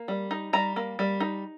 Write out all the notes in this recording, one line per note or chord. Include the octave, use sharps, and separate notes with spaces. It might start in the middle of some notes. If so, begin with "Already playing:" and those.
Already playing: A#3
G3
D#4
G3 A#5
A#3
G3
D#4